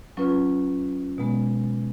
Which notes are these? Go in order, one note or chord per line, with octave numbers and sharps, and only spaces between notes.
F#3 C#4 F4 B4
B2 G#3 B3